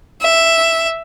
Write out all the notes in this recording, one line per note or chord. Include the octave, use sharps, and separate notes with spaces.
E5